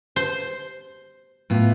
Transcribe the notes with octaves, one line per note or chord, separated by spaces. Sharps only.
C5
A2 B3 F4